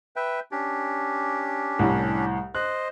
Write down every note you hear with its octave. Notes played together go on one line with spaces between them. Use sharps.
B4 E5 G5
C#4 D4 G4
C2 A2
C5 D#5 F#6